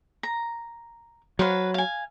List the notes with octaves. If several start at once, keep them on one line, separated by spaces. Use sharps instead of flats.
A#5
F#3 B4 C5 F5
F5 G#5